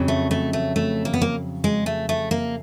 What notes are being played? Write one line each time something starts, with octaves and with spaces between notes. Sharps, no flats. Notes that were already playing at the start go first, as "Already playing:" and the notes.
Already playing: F2 C#3 F#3
A3
A3
A3
A3
A#3
B3
A#3
G#3
A3
A3
A#3